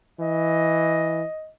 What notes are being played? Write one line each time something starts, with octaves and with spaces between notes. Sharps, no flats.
E3 D#5